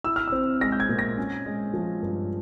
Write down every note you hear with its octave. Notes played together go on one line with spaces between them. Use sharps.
E4 E6
F6
C4 E6
G#3 A#6
G6
G#6
A#2
A#6
C#4
G#3
F3
G2